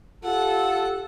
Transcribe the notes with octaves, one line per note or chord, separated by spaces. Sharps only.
F4 G4 A4 F#5